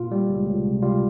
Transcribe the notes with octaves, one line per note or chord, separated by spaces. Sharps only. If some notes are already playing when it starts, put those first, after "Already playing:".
Already playing: A#2 F4
G3
C#2
C#2
C3
G3 F4